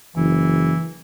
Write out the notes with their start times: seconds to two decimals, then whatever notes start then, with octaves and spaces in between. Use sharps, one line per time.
0.16 F#1 E3